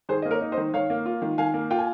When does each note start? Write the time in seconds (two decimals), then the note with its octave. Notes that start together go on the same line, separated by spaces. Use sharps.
0.09 D#3 G#4 C5
0.22 A#3 D#5
0.31 A#4 C#5
0.41 D#4
0.52 C5 D#5
0.58 D#3
0.74 D#3 C#5 F5
0.90 A#3
1.06 F4
1.22 D#3
1.38 D#3 F5 G#5
1.54 A#3
1.70 F4 G5
1.78 G#5